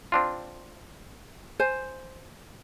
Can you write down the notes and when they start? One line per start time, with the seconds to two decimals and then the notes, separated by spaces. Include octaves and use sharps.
0.12 C4 D4 F4
1.60 C5 G#5